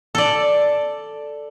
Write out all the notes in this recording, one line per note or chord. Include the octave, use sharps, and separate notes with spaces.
A4 D5